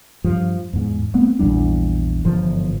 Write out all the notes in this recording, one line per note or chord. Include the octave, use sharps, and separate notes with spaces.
G2 F3
E2 G#2
G3 A3 B3 C4
A#1 E2 G3 D4
G1 G#2 E3 F3